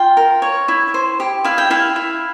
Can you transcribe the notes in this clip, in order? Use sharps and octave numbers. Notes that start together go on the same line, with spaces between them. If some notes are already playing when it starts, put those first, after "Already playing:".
Already playing: F4 G5
A#4
C#5
E4
C5
G4
E4 F5
G5
E4 F5
E4